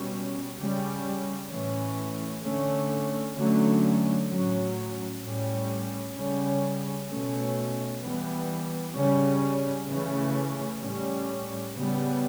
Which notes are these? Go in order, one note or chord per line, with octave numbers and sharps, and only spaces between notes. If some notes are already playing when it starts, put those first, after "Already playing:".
Already playing: B2 G3 C#4
C#3 G3 C#4
A2 E3 A3 C#4
D3 A3 C#4
D3 F#3 A3 C#4
A2 F#3 C#4
A2 G3 C#4
C#3 G3 C#4
B2 A3 C#4
E3 G3 B3
C#3 G3 C#4
C#3 E3 A3 C#4
A2 G3 C#4
C#3 G3 B3